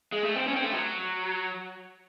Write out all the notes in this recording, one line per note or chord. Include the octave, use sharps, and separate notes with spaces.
G#3
A3
C4
C#4
C4
A3
F#3